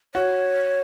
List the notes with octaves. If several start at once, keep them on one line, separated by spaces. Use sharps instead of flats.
F#4 C#5